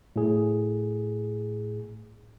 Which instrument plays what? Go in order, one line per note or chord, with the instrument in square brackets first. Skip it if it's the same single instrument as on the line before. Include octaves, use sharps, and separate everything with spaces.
[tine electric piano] A2 G#4